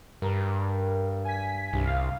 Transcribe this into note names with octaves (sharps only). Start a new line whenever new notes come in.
G2 A#4
G#5 B6
C2 G2
F5